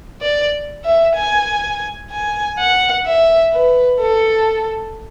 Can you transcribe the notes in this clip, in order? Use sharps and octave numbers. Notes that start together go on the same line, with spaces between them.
D5
E5
G#5
G#5
F#5
E5
B4
A4